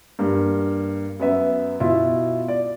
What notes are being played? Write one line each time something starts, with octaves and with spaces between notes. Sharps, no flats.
G2 A#3
F#2 B3 E5
B2 E4 F4
D5